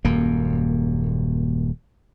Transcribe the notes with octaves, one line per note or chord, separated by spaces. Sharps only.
D#1 F#2 A#3